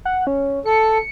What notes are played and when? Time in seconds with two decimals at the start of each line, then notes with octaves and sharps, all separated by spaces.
0.05 F#5
0.27 C#4
0.66 A4 C#7